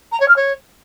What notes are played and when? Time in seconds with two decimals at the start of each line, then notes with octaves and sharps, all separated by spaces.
0.12 A#5
0.20 C#5
0.28 F6
0.36 C#5